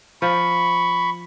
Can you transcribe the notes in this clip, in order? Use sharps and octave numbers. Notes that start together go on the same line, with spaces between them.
F3 B5 C#6